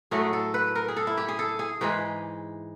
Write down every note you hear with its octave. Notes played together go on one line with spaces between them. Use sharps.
A2 F#3 A3 G#4
A4
B4
A#4
G#4
A4
E4
G4
G#4
A4
G#4
G#2 E3 G#3 G4